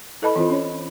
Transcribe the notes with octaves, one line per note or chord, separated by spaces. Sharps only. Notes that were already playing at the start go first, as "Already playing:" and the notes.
E4 A4 B4 D#5 A5 B5
E3 C4 F4 C5
C#4 C#5